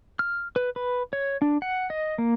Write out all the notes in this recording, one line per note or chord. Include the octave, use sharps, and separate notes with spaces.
F6
B4
B4
C#5
D4
F#5
D#5
A#3